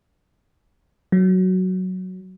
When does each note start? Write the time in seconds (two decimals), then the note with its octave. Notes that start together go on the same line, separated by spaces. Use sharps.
1.12 F#3